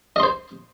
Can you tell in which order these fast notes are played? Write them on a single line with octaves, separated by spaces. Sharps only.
D#5 C6 C5